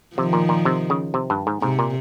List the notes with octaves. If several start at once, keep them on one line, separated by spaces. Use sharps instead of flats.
C3 D#3 F3
A#2
A#2
C3
C#3
C3
G2
G#2
G#2 C3
A#2